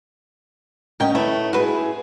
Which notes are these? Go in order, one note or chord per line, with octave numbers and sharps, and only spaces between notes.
D2 C#4 A#4 D#5 G5
A3 E4 B4 C#5
E4 F#4 G#4 B4